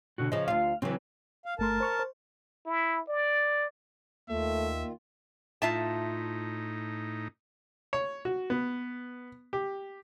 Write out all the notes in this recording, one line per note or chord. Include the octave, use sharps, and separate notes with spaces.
B2 D3 F#4
C#3 F3 D#5
D2 F4 F5
C#3 E3 F#3 C4
F5
G1 A3 A#4 A5 C6
C5 C#6 F6
C5
E4
D5
D#2 D#3 A3 F4 E5
A2 D#4 F4 E5 A5
C#5
F#4
B3
G4